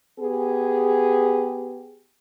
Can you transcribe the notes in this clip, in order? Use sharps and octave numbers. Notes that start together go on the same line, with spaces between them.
B3 G4 G#4